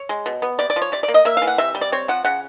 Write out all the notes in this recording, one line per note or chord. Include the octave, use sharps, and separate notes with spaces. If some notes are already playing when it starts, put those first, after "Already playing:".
Already playing: C#5
G#3
B2
B3
C3 D5
D5
F3
C#5
C3 D5
D5
A#3
D#5
A#3 E5
F5
E3
F#5
C3 E5
G3
D5
C4 C#5
F3 F#5
C#3 F#5